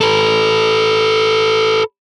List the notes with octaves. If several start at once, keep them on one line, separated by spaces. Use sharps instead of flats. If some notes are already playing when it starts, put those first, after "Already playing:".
A4 B4